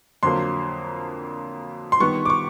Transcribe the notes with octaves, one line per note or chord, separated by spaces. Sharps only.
F2 D3 F#3 A#3 C6
C6
D#3 G3 B3 C#6
D6
C#6